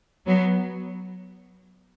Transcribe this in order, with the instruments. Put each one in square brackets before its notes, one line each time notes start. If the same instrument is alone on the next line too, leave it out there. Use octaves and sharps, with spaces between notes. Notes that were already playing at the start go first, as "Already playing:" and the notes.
[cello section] F#3 B3